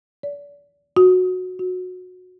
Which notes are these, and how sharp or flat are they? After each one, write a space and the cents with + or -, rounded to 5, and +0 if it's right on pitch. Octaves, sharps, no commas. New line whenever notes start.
D5 -35
F#4 -10
F#4 -20